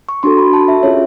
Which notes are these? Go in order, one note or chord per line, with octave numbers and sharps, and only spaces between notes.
C#6
D4 F#4 A4 C6
B5
A5
E5
C#4 F4 G#4 C#5